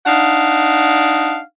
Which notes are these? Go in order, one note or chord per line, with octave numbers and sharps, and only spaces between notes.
D4 D#4 F5 F#5